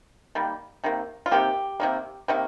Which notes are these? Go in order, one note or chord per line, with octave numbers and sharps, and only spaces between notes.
D#3 G3 A#3
C3 D#3 A#3
F4
C3 D#3 A#3 G4
C3 D#3 A#3
C3 D#3 A#3